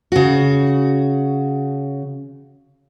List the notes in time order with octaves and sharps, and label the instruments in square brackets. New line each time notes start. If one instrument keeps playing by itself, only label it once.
[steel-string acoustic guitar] C#3 F#4